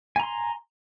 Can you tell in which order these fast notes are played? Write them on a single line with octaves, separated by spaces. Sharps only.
G#5 A#5 C6